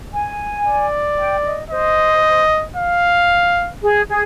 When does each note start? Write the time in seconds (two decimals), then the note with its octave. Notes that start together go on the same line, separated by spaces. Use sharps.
0.13 G#5
0.65 D5
1.18 G5
1.44 D#5
1.70 C5 D#5
2.76 F5
3.82 G#4
4.09 G#4